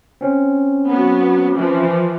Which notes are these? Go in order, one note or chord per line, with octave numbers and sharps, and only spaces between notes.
C4 C#4
F#3 B3
E3 F3